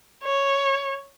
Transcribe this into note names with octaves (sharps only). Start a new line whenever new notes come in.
C#5